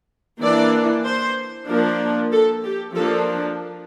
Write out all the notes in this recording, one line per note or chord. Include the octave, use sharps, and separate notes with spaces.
E3 A#3 D4 D5
C5
F3 A#3 D4 A#4
A4
G4
F3 A#3 D4 A4